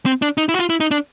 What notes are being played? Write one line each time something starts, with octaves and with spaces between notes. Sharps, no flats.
C4
D4
D#4
E4
F#4
F4
E4
D#4
D4